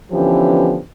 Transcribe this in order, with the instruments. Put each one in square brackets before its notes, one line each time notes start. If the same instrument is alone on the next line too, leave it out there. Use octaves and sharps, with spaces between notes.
[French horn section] D3 E3 F3 B3 C#4 G4